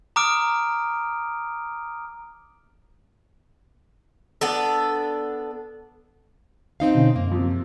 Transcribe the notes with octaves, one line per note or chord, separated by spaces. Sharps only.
A#5 D6 D#6 F6 D7
B3 D4 A4
C4 D#4 F5
B2 D3 C#4
F#2 A#3
C3 F3